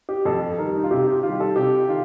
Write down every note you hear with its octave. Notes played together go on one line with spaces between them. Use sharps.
G4
F2 A4
D#3 G3 A#4
D#4
F4
C3 G4
G4
D#3 G3 F4
A4
C3 G4
D#3 F4